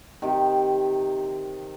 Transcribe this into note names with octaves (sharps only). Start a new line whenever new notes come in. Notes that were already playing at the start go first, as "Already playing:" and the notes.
C3 D#3